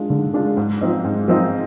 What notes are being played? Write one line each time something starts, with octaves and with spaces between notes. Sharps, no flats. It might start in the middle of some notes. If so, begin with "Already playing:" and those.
Already playing: G#3 D4 F4
D3
G#3 D4 F4
G#2
F3 C4 D#4
G#2
F3 C4 D#4